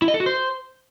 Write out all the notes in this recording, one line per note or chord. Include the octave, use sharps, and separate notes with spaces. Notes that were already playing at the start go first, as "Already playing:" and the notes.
E4
D#5
A4
F#4
C5